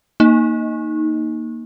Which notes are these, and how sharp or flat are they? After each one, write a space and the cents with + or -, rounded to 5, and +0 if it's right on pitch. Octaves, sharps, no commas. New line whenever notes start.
A#3 +0 D#4 +0